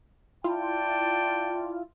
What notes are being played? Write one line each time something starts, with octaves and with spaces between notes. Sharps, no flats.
E4 F4 D5 G5 A5